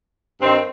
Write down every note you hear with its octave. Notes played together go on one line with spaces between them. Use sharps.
G2 D#3 C4